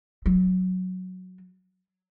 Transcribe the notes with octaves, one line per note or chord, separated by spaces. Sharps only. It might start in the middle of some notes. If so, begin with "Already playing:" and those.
F#3